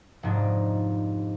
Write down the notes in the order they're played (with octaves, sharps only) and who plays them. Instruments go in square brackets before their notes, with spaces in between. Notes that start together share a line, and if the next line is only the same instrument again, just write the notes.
[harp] F1 G#2 D4 D#4